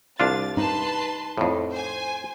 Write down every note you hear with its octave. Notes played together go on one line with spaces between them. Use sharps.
C2 D4 F4 A6
D#4 B4 A5 C6
F2 A2
C5 G#5